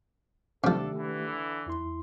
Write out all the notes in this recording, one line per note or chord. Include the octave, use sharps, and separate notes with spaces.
C3 D#3 F3 A3 D4 G4 A4
D3 E3
E2 E4 C6